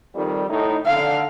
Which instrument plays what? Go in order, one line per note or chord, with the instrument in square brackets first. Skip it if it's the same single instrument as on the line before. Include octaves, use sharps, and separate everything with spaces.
[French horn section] F2 D#3 G3
A2 D#4
[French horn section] D3 [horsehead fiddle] F5